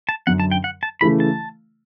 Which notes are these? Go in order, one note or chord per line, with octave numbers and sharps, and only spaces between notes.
A5
F#2 D3 F#3 F#5
A5
G5
F#5
A5
C#3 E3 A3 E4 B5
A5